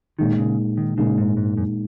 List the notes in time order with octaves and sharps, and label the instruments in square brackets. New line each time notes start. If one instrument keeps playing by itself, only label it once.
[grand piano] A#2 G#3 D#4 [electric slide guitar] D#3
[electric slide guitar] C#3
D#3
[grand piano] A#2 G#3 D#4 [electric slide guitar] C#3
[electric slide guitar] G#2
G#2
F#2